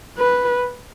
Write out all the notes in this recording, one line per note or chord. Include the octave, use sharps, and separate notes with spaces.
B4